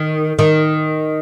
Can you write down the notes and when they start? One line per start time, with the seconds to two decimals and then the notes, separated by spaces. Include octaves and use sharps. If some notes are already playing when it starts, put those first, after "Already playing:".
Already playing: D#3
0.39 D#3